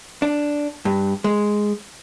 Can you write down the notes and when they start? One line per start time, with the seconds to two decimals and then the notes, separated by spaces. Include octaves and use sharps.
0.22 D4
0.85 G2
1.24 G#3